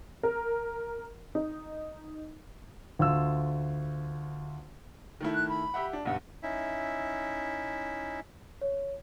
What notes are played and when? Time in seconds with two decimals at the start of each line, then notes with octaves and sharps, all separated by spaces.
0.23 A#4
1.35 D#4
2.99 D2 F4 E6
5.21 D#3 A3 E4
5.34 F#6
5.49 B5
5.74 G4 E5 F#5
5.93 D4
6.05 B1 G2 F#5
6.43 C#4 D#4 E4 E5
8.61 C#5